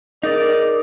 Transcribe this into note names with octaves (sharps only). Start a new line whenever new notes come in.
D#4 G#4 A#4 D5 D#6